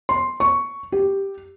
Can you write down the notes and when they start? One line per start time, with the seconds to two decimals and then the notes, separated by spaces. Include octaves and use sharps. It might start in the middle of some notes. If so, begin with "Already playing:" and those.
0.09 C6
0.40 C#6
0.92 G4